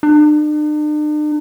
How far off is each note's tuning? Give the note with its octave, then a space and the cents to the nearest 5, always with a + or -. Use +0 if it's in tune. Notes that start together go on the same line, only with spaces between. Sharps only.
D4 +45